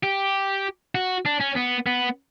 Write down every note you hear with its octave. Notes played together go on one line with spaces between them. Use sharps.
G4
F#4
D4
C#4
B3
B3